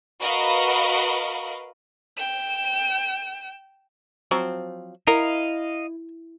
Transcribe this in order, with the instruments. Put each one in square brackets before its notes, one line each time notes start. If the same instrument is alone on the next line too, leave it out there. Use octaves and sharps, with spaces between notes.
[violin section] F#4 A#4 B4 D#5 F5 B5
[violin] G5 E7
[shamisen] F3 F#3 C4
[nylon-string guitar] E4 [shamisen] A#4 [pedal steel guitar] D#5 F5